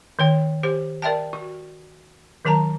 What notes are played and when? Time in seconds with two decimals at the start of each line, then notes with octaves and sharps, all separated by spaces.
0.19 D#3 C#5 G5
0.63 G4 C5
1.02 A#4 D5 E5 G5 A5
1.33 F#4
2.45 D#3 F#3 A#4 A5 A#5